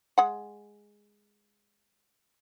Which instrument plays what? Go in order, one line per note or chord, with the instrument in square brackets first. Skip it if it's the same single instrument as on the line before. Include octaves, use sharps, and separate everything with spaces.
[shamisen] G#3 F#5